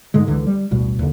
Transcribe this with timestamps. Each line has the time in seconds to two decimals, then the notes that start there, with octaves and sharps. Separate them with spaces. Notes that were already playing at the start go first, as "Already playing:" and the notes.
0.14 G#2 D3 G#3
0.27 C#2 D3 E3
0.47 G3
0.71 A1 D2 B2 G3
0.99 D#2 D3